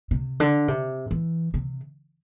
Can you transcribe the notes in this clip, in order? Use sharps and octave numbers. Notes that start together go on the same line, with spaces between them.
C3
D3
C3
E3
C3